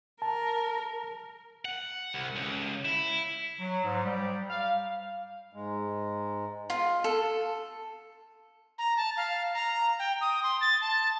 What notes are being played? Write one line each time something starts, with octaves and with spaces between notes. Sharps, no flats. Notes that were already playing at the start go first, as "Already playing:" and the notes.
A#4 A5
F#5
C2
C#2
E4
F#3
G#2
G3
F5
G#2 G#3
F4
A4
A#5
A5
F5
A#5
G5
D#6
C6
A6
A5